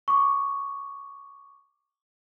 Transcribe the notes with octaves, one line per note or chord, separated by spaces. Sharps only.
C#6 D6